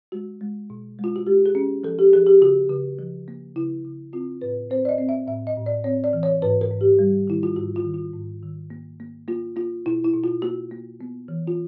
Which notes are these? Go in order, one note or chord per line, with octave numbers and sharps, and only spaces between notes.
G#3 F#4
G#3
B2
G#3 F4
F#4
G#3 G4
G#4
C#4
F3 A4
G4
F3 G#4
G4
C#3 F#4
C#3
F3
A#3
C#3 E4
C#3
C4 F4
A2 B4
C4 C5
D5
D#5
C4
E5
A2 E5
D#5
A2
D5
C4 C#5
D5
E3
C#5
G#2 B4
A#4
G#2
G4
G3
D#3 E4
F4
G#2 F#4
F4
D#3
F4
G#2
D#3
A#3
A#3
A#3 F4
A#3 F4
B2 E4
E4
B2
F4
A#3 F#4
A#3
B3
E3
F4